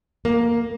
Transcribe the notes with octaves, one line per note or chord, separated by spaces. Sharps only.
A#3